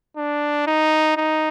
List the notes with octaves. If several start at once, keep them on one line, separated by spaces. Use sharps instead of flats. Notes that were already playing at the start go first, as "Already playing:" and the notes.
D4
D#4
D#4